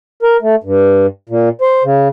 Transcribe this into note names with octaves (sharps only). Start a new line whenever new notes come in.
A#4
A3
G2
A#2
C5
C#3